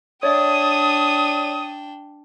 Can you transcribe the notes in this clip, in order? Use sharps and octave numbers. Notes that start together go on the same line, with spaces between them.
D4 C#5 D5 E5 G5 D#6